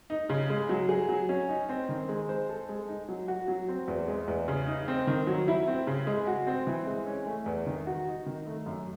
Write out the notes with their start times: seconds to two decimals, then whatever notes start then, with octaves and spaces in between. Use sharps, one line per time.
0.10 D#4
0.29 C#3
0.50 G#3
0.69 F#3
0.89 G#4
1.09 F#3
1.29 C#4
1.49 D#4
1.69 C4
1.89 D#3
2.09 G#3
2.29 C5
2.49 A4
2.69 G#3
2.89 D#4
3.09 F#3
3.28 F#4
3.48 F#3
3.68 C4
3.88 E2
4.08 G#3
4.28 E2
4.48 C#3
4.67 D#4
4.88 C4
5.07 D#3
5.27 F#3
5.48 E4
5.67 C4
5.87 C#3
6.07 G#3
6.27 F#4
6.47 C4
6.67 E3
6.87 G#3
7.07 C#4
7.26 A3
7.46 E2
7.67 D#3
7.87 F#4
8.07 D#4
8.26 D#3
8.47 A3
8.66 F#2